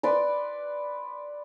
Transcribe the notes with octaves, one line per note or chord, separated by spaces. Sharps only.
B4 D5 C6